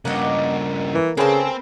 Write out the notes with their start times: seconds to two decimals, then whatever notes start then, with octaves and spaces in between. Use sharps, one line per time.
0.05 G2 C#3 A#3 D#5 F#5
0.94 E3
1.17 C#3 G#3 C4 A#4 B4 G5 A5